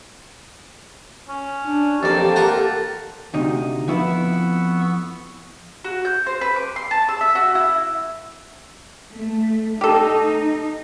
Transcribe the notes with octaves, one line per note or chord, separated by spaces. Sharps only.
C#4
D4
F2 A#3 G4 A4 D5 A5
F4 A#4 F#5
D2 C3 D#4
F2 B3 E4 B4 C#6 E6
F#4
G6
C5
B4
D6
C6
A5
E6
E5
F#4
E4
A3
D#4 G4 A4